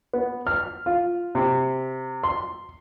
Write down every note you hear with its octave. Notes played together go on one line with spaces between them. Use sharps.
B3
F6
F4
C3
C6